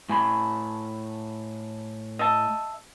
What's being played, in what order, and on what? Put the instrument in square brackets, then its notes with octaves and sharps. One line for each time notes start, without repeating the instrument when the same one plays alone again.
[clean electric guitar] A2 G#5 B5
[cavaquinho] D#5 E5 A5